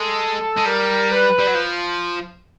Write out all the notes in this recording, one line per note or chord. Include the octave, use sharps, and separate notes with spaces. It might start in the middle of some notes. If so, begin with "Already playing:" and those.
Already playing: G#3 A4
G#3
G3 A#4
B4
G3
F#3
F3